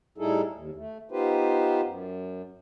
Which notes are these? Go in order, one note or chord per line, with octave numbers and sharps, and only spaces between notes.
A2 G3 D#4 E4 G#4 A4
D#2
A3
B3 D#4 F4 G4 B4 C5
F#2